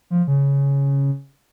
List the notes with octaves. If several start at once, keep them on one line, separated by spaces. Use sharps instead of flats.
F3
C#3